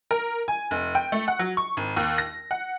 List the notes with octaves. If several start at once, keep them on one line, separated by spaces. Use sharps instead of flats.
A#4
G#5
F1
G5
A3
F#5
F#3
C#6
G#1
D#2
A#6
F#5